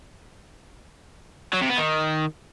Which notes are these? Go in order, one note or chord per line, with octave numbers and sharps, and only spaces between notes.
F#3
C3
B3
D#3